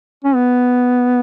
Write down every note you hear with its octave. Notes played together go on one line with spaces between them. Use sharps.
C#4
B3